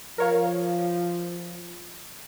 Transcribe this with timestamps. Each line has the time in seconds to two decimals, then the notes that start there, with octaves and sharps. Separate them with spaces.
0.18 F3 A#4 C#5 F5